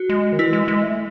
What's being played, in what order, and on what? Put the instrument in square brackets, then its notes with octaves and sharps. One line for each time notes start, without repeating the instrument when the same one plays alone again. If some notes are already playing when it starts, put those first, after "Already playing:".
Already playing: [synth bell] F#4
[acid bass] G#3
D#3
[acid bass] E3 [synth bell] E4
[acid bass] G#3
G#3
A3